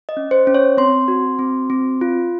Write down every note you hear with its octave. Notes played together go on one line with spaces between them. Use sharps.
D#5
C#4
C5
C#4
C#5
C4 C6
F#4
C4
C4
F4